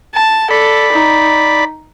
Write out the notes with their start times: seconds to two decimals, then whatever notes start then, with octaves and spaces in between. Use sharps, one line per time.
0.15 A5
0.51 A4 D5 B5
0.92 D#4